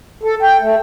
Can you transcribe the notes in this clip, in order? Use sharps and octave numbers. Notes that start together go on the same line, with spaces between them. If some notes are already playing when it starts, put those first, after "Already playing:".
A4
G5
A3